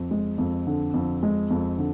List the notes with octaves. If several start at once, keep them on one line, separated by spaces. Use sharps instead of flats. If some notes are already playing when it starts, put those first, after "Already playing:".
Already playing: F2
G#3
F2
D3
F2
G#3
F2
D3